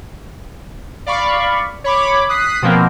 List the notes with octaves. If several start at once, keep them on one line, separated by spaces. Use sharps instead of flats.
D5 F5 B5 C#6
C#5 B5 D6
D#6 F#6 B6 C7
B2 F3 A#3 C4